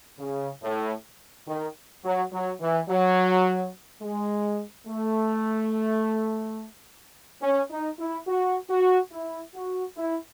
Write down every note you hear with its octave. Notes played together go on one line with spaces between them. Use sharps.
C#3
A2
D#3
F#3
F#3
E3
F#3
G#3
A3
C#4
D#4
E4
F#4
F#4
E4
F#4
E4